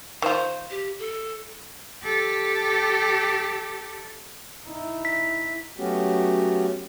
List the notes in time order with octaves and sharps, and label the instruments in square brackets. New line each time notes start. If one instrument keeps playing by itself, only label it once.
[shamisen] D#3 F4 [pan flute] C5
[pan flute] G4
A4
[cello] G4 A4
[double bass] D#4 E4
[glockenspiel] B6
[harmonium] F#3 A3 B3 C#4 F#4 G4